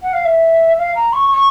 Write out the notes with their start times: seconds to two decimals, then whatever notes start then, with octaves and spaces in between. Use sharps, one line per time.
0.02 F#5
0.13 F5
0.25 E5
0.78 F5
0.95 A#5
1.13 C#6
1.31 C#6